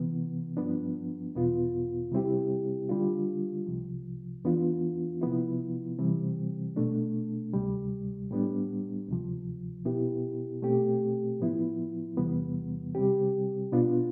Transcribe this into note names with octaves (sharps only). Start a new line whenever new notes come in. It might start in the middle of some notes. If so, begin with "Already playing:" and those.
Already playing: C3 E3 B3
G2 F3 B3 D4
E2 B2 B3 F4
C3 G3 C4 E4 G4
D3 G3 D4 F4
C2 C3 F3
F2 E3 B3 D4 F4
C3 F3 B3 E4
C3 E3 G3 C4
B2 A3 D4
D2 C3 G3
A2 G3 B3 D4
D2 C3 F3
B2 B3 E4 G4
B2 A3 C4 G4
A2 F3 B3 E4
E2 C3 E3 G3 B3
C3 G3 C4 G4
B2 B3 D4 F4